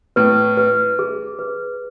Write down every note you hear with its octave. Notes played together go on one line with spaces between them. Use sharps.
A2 B4
B4
G#4
B4